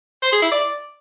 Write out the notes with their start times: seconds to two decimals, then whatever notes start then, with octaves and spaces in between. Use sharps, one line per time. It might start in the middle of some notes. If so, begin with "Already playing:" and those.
0.23 C5
0.32 G#4
0.42 E4
0.51 D5